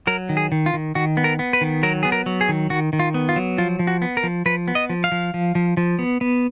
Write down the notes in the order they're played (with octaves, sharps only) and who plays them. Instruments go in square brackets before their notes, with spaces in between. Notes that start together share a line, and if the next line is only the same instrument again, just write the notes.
[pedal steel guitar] F#3 A#4
D#3
G#4
D#3
F4
D#3
D#3 F#4
B3
A#4
B3
B4
D#3
F#3 A#4
B3 G#4
A#4
F#3
G#4
D#3
D#3 F#4
D#3
F4
B3
F4
F#3
F3 F4
F3
F#4
B3
A#4
F3
F3 B4
B3
D#5
F3
F5
F3
F3
F3
F3
B3
B3